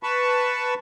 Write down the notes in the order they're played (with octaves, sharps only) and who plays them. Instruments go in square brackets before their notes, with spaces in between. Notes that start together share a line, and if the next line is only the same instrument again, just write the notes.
[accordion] B4 A5 B5 C#6